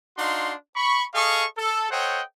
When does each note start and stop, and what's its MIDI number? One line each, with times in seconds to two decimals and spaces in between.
0.18 0.53 62
0.18 0.53 63
0.18 0.53 66
0.18 0.53 77
0.18 0.53 84
0.76 1.04 83
0.76 1.04 85
1.15 1.45 68
1.15 1.45 69
1.15 1.45 75
1.15 1.45 77
1.15 1.45 85
1.58 1.87 69
1.91 2.22 69
1.91 2.22 72
1.91 2.22 73
1.91 2.22 75
1.91 2.22 78
1.91 2.22 79